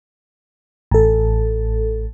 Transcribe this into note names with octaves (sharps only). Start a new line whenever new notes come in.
A1 A4